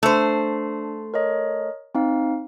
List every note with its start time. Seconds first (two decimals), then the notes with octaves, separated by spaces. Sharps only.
0.03 A3 D4 C5
1.14 A#4 C#5 D#5
1.95 C4 D#4 F5